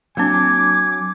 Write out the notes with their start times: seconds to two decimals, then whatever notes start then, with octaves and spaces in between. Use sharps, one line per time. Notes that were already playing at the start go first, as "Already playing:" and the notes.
0.17 F#3 A#3 C4 D4 G#5 D6